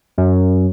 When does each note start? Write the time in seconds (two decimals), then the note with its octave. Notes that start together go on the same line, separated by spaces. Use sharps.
0.18 F#2